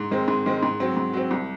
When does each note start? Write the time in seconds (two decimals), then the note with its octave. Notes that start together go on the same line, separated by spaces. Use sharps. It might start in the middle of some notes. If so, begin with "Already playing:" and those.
Already playing: G#2
0.11 D#3 G#3 C4
0.28 G#2
0.46 D#3 G#3 C4
0.63 G#2
0.80 F#3 C4
0.97 G#2
1.13 F#3 C4
1.31 C2